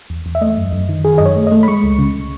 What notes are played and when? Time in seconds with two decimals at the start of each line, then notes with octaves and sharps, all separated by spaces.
0.10 E2
0.26 E2
0.35 E5
0.41 A3 D#5
0.57 F#2
0.73 F#2
0.89 D#3
1.04 D#3 G#4
1.18 F#2 D#5
1.25 C#5
1.36 A3
1.47 A3 D#5
1.63 B5
1.68 G#3 C#6
1.84 C#2
1.99 C#3